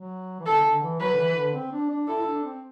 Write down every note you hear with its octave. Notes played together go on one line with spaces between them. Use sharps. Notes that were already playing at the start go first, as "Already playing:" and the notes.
Already playing: F#3
E3
D3 A4
D3
E3
F#3 B4
D3
E3
D3
C4
D4
D4
E4 A4
E4
D4
C4